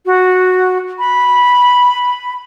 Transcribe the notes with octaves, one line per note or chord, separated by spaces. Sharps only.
F#4
B5